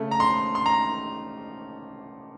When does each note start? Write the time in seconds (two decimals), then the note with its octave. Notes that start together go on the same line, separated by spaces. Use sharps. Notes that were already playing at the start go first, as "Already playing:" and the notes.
Already playing: C#3 A3
0.11 A#5
0.20 C6
0.55 C6
0.66 A#5